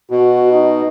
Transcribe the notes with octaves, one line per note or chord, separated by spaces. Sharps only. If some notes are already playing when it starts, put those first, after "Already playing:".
B2 F#4
D#4